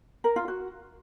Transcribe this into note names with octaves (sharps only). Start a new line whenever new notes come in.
A#4
F4
F#4